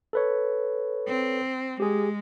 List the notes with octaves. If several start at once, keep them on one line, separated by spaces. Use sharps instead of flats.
A4 B4 C#5
C4
G#3 G4 G#4